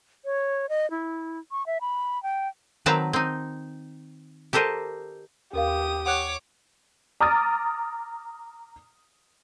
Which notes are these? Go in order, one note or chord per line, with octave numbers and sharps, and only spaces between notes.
C#5
D#5
E4
C#6
E5
B5
G5
D#3 F#3 C4 B4 A5 A#5
C4 D#4
G4 A4 A#4 C5 D#5
D#2 G4 A#4 F5 D#6
C#5 F#5 D6 F#6
A#5 D6 D#6 F6 A6